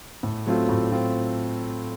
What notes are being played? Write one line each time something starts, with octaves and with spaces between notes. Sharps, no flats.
A2
F#3 A3 C4 F4
A2
C4 F4